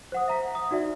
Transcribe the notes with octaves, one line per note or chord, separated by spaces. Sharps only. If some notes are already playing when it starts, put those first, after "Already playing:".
C5 F#5 D#6
E5 A#5 B6
D#6
D#4 F#4 D5 E5